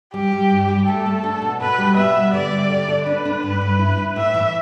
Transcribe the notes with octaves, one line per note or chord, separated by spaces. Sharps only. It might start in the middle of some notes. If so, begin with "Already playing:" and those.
G3 G4
G3
G2
G3
A3 A4
A3
D4
B2
B2 B4
G3
B3 E5
G3
D3 D5
G3
D3
A4
D4 B4
D4
G2
G2
E4
E4
A2 E5
E3